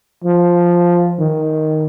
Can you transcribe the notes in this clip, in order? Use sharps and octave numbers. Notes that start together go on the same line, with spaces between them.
F3
D#3